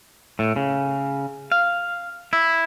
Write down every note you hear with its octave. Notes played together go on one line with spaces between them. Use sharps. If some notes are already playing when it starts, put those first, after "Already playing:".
A2
C#3
F5
E4